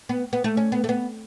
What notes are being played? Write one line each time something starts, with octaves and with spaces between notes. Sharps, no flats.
B3
B3
A3
C#4
B3
A3
B3